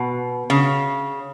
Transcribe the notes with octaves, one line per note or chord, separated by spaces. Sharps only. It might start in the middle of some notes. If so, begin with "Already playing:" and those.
Already playing: B2
C#3